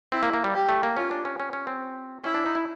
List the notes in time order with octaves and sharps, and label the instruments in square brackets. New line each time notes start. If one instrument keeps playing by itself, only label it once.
[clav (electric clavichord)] C4 [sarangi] E4
[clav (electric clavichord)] A#3
A#3
G3
[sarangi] G4
[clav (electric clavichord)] A3
A#3
[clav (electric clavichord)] C#4 [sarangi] F4
[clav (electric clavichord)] D4
C#4
C#4
C#4
C4
[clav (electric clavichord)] C#4 [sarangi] E4
[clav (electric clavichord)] D4
D#4
E4